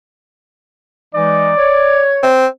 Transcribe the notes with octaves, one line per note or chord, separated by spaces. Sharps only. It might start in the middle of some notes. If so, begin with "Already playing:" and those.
E3 G#3 D#4 D5
C#5
C4